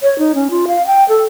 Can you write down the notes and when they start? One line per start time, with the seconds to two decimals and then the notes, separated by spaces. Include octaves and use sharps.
0.03 C#5
0.19 D#4
0.35 C#4
0.51 F4
0.68 F5
0.87 G5
1.09 A4